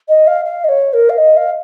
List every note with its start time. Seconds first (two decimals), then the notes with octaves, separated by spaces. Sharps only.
0.08 D#5
0.27 F5
0.45 F5
0.64 D#5
0.68 C#5
0.93 A#4
1.09 F5
1.18 D#5
1.36 F5